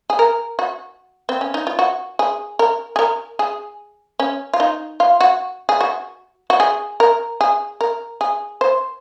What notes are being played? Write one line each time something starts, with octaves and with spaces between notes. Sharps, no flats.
G#4
A#4
F#4
C4
C#4
D#4
F4
F#4
G#4
A#4
G#4
A#4
G#4
C#4
F4
D#4
F4
F#4
G#4
F#4
F#4
G#4
A#4
G#4
A#4
G#4
C5